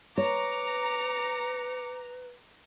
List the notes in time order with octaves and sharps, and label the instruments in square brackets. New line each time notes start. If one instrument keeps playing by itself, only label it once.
[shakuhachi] B4 [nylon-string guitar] C#5 [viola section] A#5 [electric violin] D6 C#7